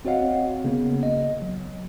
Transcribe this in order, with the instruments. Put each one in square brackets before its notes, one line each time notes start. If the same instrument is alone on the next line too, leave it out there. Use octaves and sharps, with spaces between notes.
[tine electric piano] C4 F#4 C#5 D#5 F5 F#5
C#3 A#3 B3
D#5
F#3